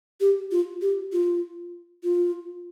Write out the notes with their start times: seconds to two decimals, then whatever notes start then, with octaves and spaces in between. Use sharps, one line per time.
0.21 G4
0.52 F4
0.82 G4
1.12 F4
2.04 F4